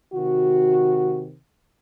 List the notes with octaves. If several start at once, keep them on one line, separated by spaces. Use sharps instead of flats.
C3 D#3 F#4